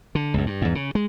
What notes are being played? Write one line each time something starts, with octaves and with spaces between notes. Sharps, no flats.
D3
C#2 F#2
G2
E2 G#2
C#3
G#3